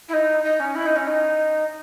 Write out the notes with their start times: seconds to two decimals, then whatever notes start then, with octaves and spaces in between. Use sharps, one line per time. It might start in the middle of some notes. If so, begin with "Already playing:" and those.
0.08 E4
0.13 D#4
0.43 D#4
0.59 C#4
0.75 E4
0.85 D#4
0.96 C#4
1.07 D#4